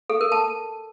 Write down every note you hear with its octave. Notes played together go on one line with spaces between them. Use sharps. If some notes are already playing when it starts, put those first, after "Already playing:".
A4
A#4
A5